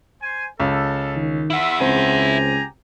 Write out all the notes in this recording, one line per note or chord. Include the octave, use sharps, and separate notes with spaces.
C5 G#5
C#2 A4
D#3
E4 F4 E5 F#5
C#2 C4 G4 G#5 A#5